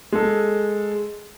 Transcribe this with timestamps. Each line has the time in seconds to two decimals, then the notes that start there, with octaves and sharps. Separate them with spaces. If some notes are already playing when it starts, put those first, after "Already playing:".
0.12 G#3 A4